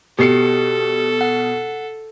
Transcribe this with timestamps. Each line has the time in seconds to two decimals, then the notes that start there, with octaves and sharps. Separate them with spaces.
0.19 B2 G4 A4 C7 C#7
1.21 F#5